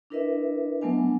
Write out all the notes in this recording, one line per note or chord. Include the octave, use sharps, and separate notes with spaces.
D4 E4 A#4 B4 D#5 E5
F#3 A3 B3 D4 G#5